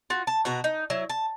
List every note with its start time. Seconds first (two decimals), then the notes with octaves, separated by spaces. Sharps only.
0.10 F4 F#4
0.27 A5
0.45 B2 F#4 A#5
0.64 D#4
0.90 F#3 E4
1.09 A5